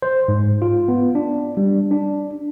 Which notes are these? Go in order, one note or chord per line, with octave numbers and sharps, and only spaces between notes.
C5
G#2
F4
B3
D4
G3
D4